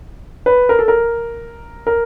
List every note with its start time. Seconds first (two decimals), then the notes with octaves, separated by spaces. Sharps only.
0.46 B4
0.69 A#4
0.79 A4
0.88 A#4
1.87 A#4